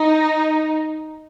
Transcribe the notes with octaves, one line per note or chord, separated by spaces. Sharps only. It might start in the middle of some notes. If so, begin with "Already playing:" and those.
Already playing: D#4